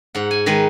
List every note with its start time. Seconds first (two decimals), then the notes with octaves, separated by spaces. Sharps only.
0.15 G#2 F#5
0.31 G#5
0.46 D#3 G#3 B4